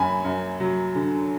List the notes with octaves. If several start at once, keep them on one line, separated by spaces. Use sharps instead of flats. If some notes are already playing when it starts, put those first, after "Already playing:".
Already playing: F#2 F#3 G#5 B5
F#2
F#3
D3